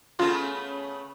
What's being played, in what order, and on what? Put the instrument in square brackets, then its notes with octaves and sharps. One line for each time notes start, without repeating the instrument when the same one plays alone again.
[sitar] C#3 A3 B3 [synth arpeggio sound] F4 C6